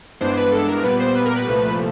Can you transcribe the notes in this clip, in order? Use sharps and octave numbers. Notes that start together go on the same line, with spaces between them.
G2 E3 G#3 B3 D4 C5
B4
A4
A#4
A#2 G3 B3 B4
C5
B4
A#4
B4
C2 A#2 F3 A3